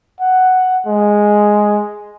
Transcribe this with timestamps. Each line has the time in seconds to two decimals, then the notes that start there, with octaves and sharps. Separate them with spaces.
0.21 F#5
0.86 G#3